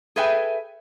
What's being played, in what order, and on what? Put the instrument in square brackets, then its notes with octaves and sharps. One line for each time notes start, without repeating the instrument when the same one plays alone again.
[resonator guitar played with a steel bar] G#4 A4 B4 E5 G5 G#5